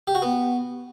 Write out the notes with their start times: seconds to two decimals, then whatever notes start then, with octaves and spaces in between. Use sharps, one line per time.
0.07 G4
0.15 F#4
0.22 B3